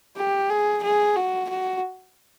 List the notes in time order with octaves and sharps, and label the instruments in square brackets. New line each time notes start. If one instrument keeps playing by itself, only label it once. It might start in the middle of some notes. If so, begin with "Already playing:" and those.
[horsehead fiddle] G4
G#4
G#4
F#4
F#4